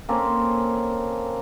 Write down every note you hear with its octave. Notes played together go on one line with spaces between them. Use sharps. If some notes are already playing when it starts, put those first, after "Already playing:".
A#3 C4 C#4 A4